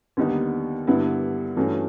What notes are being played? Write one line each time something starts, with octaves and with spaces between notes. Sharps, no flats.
D#2 D3 G3 B3 D#4
G2 D3 G3 B3 E4
G2 E3 A3 C#4 F#4